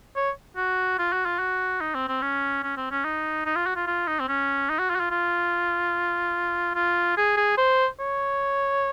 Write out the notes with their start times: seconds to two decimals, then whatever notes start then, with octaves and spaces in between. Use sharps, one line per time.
0.16 C#5
0.56 F#4
0.99 F4
1.13 F#4
1.26 F4
1.39 F#4
1.81 D#4
1.95 C4
2.08 C4
2.22 C#4
2.63 C#4
2.77 C4
2.91 C#4
3.05 D#4
3.46 D#4
3.56 F4
3.66 F#4
3.76 F4
3.87 F4
4.07 D#4
4.20 C4
4.28 C#4
4.70 D#4
4.79 F#4
4.90 F4
4.95 F#4
5.00 F4
5.11 F4
6.75 F4
7.17 G#4
7.37 G#4
7.57 C5
8.00 C#5